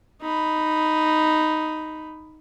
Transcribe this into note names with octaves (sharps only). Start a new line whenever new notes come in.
D#4 B5